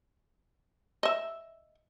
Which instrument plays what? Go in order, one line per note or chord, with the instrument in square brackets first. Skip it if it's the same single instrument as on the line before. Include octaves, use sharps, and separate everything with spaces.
[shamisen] D#5 E5